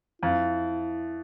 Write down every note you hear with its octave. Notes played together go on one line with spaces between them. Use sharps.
F2 E4